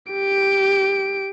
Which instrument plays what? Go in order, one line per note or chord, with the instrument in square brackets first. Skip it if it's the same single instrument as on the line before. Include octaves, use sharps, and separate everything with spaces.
[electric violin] G4 D7